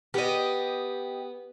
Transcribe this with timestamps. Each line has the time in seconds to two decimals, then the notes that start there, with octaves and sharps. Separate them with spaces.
0.14 B3 G4 D#5